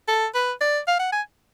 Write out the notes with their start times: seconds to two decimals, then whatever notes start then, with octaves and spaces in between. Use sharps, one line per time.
0.08 A4
0.34 B4
0.61 D5
0.87 F5
0.99 F#5
1.12 G#5